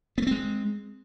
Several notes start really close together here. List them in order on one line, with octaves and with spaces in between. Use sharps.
B3 A3 C4 G#3